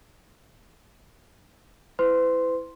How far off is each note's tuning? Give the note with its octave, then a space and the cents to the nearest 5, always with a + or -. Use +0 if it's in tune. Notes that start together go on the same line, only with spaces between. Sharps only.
E4 +0 B4 +45 C6 +0